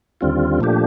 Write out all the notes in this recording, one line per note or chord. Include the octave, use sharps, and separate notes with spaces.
D#2 D3 G3 C4 F4
A#2 F3 A3 D4 G4